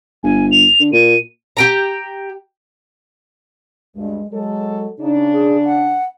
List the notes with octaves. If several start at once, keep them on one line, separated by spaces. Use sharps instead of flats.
G1 G#5
F7
D3
A#2 D#7
G4 G5 A#5
D2 G2 G#3
F#3 G#3 A4
C#3 D4 D#4
G#4
F#5